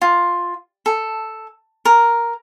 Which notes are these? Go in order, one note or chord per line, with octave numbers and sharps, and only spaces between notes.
F4
A4
A#4